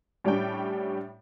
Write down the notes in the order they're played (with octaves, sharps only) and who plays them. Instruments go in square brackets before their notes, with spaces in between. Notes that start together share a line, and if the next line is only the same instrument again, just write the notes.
[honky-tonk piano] A2 G3 C#4 D4 G5